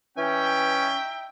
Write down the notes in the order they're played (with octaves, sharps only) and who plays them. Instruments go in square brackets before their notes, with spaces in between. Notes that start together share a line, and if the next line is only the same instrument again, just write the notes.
[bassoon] E3 [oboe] C#4 [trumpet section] D#4 E5 G5